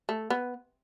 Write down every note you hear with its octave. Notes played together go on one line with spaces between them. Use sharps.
A3
B3